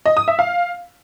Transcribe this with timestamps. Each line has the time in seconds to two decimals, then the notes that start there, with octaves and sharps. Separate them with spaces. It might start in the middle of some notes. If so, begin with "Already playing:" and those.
0.06 D#5
0.17 D#6
0.28 E5
0.39 F5